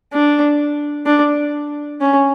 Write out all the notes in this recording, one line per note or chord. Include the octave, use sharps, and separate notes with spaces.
D4
D4
C#4